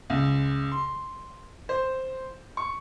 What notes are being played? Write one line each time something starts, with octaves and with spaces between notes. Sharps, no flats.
C#2
C6
C5
C#6